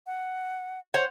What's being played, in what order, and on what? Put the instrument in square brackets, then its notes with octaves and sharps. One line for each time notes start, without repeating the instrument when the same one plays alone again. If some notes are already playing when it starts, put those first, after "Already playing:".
[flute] F#5
[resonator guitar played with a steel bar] C5 C#5 F#5